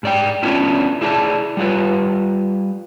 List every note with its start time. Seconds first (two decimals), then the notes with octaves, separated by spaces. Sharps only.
0.03 G#2 D5 G5
0.43 A3 B3 C#4 D4 E4 F4
1.01 A3 E4 G#4 D5 A5
1.57 G3 F4 B4